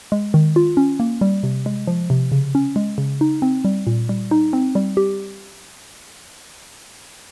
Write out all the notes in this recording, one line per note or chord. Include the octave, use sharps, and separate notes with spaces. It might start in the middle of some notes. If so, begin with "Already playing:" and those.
G#3
D#3
F4
C#4
A#3
G3
C3
G#3
F3
C3
C#3
C#4
G#3
C#3
D#4
C4
G3
A#2
G3
D#4
C4
G3
G4